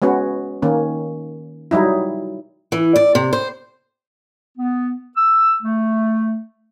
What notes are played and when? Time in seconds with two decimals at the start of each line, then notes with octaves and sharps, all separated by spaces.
0.02 G#3 B3 C#4 F#4
0.62 D#3 A#3 C#4
1.71 F#3 G3 D#4 E4
2.72 E3
2.96 D5
3.15 C3
3.33 C5
4.58 B3
5.17 E6
5.61 A3